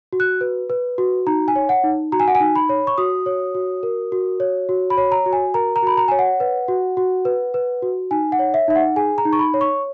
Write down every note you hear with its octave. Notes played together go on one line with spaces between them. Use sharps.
F#4
F#6
B4
B4
F#4
D#4 A#5
G#5
C#5
F#5
D#4
F#4 A#5
G#5
F#5
G#5
D#4
B5
C#5
C#6
F#4 D#6
C#5
F#4
A#4
F#4
C#5
F#4
B5
C#5
A#5
F#4
G#5
A#4 A#5
A#5
F#4 B5
A#5
C#5 G#5
F#5
B4
F#4
F#4
B4
B4
F#4
D#4 G#5
F#5
C#5
E5
D#4 E5
F#5
G#4 G#5
A#5
D#4
C#6
B5
C#5
C#6